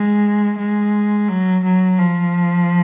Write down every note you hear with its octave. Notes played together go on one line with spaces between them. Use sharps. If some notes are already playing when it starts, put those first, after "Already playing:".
Already playing: G#3
G#3
F#3
F#3
F3